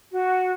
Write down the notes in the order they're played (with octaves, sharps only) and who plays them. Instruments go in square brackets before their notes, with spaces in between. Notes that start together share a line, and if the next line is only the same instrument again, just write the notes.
[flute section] F#4